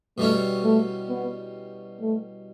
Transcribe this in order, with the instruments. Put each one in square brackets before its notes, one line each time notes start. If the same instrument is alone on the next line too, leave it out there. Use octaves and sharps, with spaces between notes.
[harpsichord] B2 G3 C#4 E4 [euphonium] A3
[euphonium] A3
B3
A3